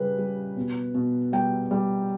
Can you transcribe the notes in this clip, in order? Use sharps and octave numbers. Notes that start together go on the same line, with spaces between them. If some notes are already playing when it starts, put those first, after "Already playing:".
Already playing: C#3 G3 B4
G3
B2
B2
G3 G5
G3